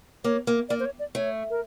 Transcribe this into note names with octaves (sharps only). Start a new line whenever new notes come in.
A#3 C#5
A#3
A#3 D5
C5
C#5
D5
A3 C#5
A#4